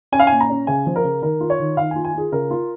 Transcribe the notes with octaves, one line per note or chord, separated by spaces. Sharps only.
C#4 G#5
F5
A#2 G#5
A#5
C#4
C#3 G#5
F3
A#4
C#3
D#3 A#4
F4
C#5
D#3
D#3 F5
G#5
F4
G#5
F4 G#4
C#3 A#4
F4